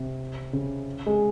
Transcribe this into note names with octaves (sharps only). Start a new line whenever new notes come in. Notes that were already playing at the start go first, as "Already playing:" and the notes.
Already playing: C3
C#3
G#3